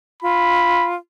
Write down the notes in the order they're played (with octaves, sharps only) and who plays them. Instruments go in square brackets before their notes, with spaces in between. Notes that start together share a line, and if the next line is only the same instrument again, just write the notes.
[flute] F4 [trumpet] B5